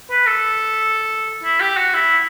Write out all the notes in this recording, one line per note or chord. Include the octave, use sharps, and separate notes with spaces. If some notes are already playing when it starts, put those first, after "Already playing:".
B4
A4
E4
G4
F#4
E4